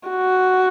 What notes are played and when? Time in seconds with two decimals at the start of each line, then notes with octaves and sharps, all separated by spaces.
0.08 F#4